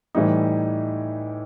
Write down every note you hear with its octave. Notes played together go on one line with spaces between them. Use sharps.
A2 E3 G3 D#4